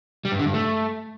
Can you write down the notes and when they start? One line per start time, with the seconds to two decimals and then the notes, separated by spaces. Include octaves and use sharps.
0.25 G3
0.32 G2
0.39 D3
0.46 G2
0.54 A3